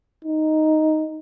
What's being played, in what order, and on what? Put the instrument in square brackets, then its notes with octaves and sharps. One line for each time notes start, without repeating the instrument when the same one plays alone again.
[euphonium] D#4